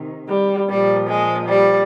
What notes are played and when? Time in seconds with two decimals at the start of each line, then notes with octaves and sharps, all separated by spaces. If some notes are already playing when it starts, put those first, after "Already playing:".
Already playing: C3 D#3
0.28 G3
0.68 A#2 F3 G3
1.08 G#3
1.48 G3